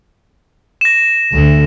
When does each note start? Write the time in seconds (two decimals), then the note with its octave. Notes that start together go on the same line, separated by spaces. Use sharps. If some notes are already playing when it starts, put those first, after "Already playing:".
0.81 A#6 E7
1.32 D2